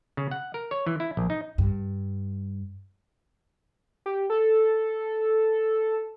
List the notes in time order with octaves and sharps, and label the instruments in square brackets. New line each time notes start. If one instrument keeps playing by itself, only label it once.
[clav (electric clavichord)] C#3
F#5
A#4
C#5
E3
E4
A#1
D#4
[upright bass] G2
[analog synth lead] G4
A4